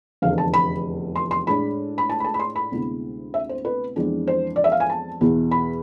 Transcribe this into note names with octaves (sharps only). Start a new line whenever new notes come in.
F1 E2 D3 F5
A5
B5
C6
C6
A2 G#3 D4 B5
B5
A5
B5
A5
B5
C6
B5
D2 C3 G#3 B3 E4
E5
C5
B4
F2 E3 G#3 B3 D4
C5
D5
E5
F5
G#5
A5
E2 B2 B3 E4
B5